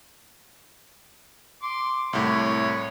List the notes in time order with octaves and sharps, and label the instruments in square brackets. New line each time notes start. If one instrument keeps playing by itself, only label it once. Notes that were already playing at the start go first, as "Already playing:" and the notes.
[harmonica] C6 D6
[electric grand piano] C2 A2 [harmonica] C#5